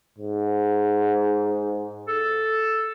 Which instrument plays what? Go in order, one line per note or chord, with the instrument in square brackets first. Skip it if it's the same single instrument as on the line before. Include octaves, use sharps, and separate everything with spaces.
[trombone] G#2
[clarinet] A4